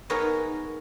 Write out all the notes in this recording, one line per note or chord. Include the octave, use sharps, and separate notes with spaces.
B3 D#4 G#4 A#4 B4 C#5